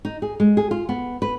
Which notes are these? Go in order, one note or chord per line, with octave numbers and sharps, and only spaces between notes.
D#4
G#4
G#3
G#4
F4
B3
B4